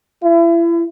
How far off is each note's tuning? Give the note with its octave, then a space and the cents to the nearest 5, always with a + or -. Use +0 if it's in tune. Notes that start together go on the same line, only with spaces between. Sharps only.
E4 +35